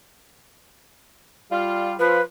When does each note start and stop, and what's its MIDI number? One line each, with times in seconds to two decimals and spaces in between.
1.51 1.92 55
1.51 1.92 65
1.99 2.19 53
1.99 2.22 71